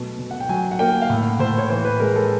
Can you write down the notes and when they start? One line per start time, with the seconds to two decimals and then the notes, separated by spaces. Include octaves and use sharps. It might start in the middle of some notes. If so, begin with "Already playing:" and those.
Already playing: B2 F#3 A3
0.19 B2
0.31 F#5
0.40 G5
0.49 F#3 G#5
0.71 F#5
0.79 A#3 G5
1.02 F5
1.10 A2 F#5
1.39 A2 C5
1.58 C#5
1.70 E3 C5
1.85 B4
2.00 G#3 A#4
2.16 A4